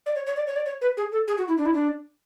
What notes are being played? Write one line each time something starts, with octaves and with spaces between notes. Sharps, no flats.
D5
C#5
C#5
D5
C#5
D5
C#5
B4
G#4
A4
G#4
F#4
E4
D4
E4
D4